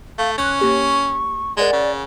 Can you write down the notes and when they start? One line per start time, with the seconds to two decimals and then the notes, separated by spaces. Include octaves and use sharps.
0.18 A3 F5
0.38 B1 C#4 C#6 F#6 G#6
0.59 A#3 G4 C#5
1.57 G#3 A#4 D5 F#5 G#5
1.73 C#3